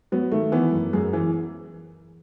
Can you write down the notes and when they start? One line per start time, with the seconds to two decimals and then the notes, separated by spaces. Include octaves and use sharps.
0.12 F#3 B3
0.32 D#3 A3
0.52 E3 B3
0.72 F#2
0.93 F#2 G#4
1.13 E3